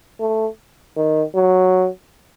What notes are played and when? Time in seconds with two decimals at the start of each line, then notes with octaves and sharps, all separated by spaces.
0.20 A3
0.96 D#3
1.34 F#3